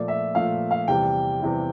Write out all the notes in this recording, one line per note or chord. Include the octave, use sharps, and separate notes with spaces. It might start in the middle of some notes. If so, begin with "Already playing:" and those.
Already playing: A#2 F3 A3 D5
E5
A#2 F3 A3 F5
F5
E2 C3 E3 G3 G5
E2 C3 E3 G3